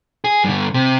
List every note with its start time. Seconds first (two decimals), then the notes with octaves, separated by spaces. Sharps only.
0.24 G#4
0.44 G2 D3
0.74 C3